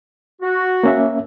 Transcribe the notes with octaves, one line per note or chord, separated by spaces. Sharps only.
F#4
A#3 C#4 E5